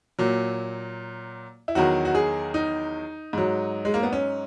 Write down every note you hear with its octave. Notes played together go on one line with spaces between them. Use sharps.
A#2 F#3
E4
E2 D#3 F#3 F#4
F#4
G#4
D#4
G#2 F#3
G#3
A#3
B3
C#4